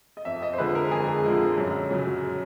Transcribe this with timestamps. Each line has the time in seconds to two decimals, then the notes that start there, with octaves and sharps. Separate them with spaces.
0.17 D#5
0.25 F2 E5
0.42 D#5
0.53 C5
0.58 D3 F3 G#3 B4
0.75 A#4
0.91 F2 G#4
1.24 D3 F3 G#3
1.58 F#2
1.91 C#3 F#3